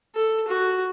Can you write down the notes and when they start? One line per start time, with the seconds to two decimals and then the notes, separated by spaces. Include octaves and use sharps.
0.15 A4
0.48 F#4